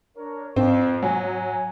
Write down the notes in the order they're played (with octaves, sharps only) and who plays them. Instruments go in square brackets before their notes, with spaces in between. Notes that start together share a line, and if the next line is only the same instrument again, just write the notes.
[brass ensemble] D4 A#4 C#5
[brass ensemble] F2 [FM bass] G#2 [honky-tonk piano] C4
[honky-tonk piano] F#3 [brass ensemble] G#5